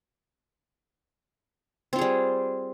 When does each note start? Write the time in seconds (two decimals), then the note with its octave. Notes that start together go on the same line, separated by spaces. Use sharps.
1.93 C4
1.96 F4
1.99 G#4
2.01 G3